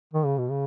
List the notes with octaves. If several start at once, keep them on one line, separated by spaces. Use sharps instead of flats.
D#3
C#3
B2
C#3